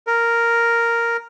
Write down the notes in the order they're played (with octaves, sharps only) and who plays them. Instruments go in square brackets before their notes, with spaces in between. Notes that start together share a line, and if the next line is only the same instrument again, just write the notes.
[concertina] A#4